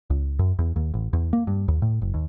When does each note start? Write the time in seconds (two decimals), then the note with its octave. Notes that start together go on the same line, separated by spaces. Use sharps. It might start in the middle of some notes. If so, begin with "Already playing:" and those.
0.10 C#2
0.39 F#2
0.59 E2
0.76 D#2
0.94 A1
1.13 E2
1.33 A#3
1.47 G2
1.68 D#2
1.82 A2
2.02 F#1
2.14 D#2